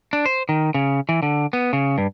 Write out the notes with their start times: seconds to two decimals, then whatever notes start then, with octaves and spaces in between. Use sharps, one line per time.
0.13 D4
0.26 C5
0.49 D#3
0.74 C#3
1.09 E3
1.23 D3
1.53 B3
1.73 C#3
1.98 G2